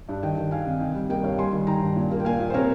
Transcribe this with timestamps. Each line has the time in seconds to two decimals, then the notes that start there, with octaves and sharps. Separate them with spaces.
0.09 G2
0.22 D#3 D#5 G5
0.38 D#3
0.51 D#3 F5 G#5
0.66 C3
0.80 D#3 D#5 G5
0.95 G3
1.09 A#3 D#5 G5
1.23 G2 C#5 F5
1.38 G3 G#5 C6
1.52 D#3
1.67 D#3 G5 A#5
1.82 G2
1.96 A#2
2.11 A#3
2.20 G5
2.25 A#2 F5 G#5
2.40 A#2
2.50 C5
2.54 C3 A#4 C#5